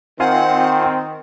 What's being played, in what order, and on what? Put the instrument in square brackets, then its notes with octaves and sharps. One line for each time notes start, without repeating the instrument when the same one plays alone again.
[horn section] D#3 [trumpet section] C4 [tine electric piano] F4 F5 G#5 [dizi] F#5